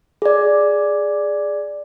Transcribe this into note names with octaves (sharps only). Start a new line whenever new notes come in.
G#4 D5